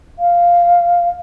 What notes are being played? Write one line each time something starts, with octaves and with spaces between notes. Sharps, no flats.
F5